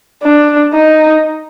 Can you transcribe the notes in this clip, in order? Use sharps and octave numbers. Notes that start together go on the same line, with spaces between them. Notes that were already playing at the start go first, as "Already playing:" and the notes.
D4
D#4